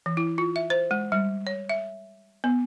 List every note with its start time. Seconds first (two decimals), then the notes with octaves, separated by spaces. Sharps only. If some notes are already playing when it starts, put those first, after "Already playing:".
0.06 E3
0.17 E4
0.38 F4
0.56 E5
0.70 C5
0.91 G#3
1.12 G3
1.47 C#5
1.69 E5
2.44 B3